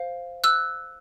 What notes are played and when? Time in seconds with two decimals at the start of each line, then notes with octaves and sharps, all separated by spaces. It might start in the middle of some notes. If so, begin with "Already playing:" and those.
Already playing: C5 F5
0.44 E6 F#6